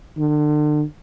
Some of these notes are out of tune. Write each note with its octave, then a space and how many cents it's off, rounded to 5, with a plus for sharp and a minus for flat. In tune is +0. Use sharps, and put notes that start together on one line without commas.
D3 +35